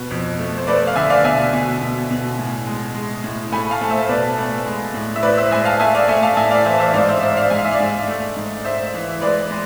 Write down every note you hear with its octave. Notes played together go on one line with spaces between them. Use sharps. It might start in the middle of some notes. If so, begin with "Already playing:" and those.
Already playing: B2 B4
F2
A3
C5
A3 B4 D5
F5
D3 E5 G#5
D5 F5
B2 E5 G#5
B2
B2
B2
A2
G#3
G#3
A2
A3 G#5 B5
B5
F5 A5
A3
C5 E5
B2 B4 D5
A3
G#3
A2
E5
A2 B4 D5
C5 E5
G#3 E5 G#5
F5 A5
A3 E5 G#5
D5 F5
A3 E5 G#5
F5 A5
A2 E5 G#5
D5 F5
E3 C5 E5
C5 E5
G#2 D5 F5
C5 E5
G#2 C5 E5
D5 F5
G#2 G#5
F5
E5
D5 F5
G#2
A3
G#2
G#2 C5 E5
E3
G#3 B4 D5
G#3